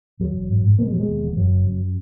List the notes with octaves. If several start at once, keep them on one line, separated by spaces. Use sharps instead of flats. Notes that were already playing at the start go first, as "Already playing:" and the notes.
D#2 F#3
E1
G#2
G#2
B2 A#3
G#3
B2 F#3
G#3
D#2
E1
F#2 F#3
F#1
F#2